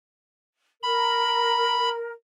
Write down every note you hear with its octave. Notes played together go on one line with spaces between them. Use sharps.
A#4 B5